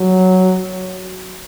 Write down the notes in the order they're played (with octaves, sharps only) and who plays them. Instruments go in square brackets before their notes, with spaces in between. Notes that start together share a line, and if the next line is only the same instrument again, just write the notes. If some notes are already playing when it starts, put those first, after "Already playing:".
Already playing: [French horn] F#3